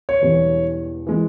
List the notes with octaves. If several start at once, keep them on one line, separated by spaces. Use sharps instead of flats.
C#5
E1 E2 E3 G3
E3 G#3